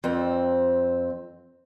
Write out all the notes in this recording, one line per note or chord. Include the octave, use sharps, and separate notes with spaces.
F2 C4